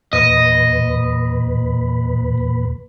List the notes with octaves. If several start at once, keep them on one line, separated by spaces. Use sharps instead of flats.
E2 A#2 B4 D#5